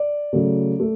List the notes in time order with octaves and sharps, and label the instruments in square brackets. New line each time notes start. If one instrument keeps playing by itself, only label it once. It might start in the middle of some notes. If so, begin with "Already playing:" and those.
Already playing: [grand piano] D5
C#3 F#3 A3
A3